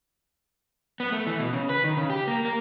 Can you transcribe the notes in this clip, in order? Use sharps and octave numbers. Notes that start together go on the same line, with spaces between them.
B3
A3
E3
B2
C#3
B4
D#3
C#3
G4
A#3
A#3